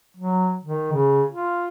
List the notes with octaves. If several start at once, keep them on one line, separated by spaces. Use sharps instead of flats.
F#3
D#3
C#3
F4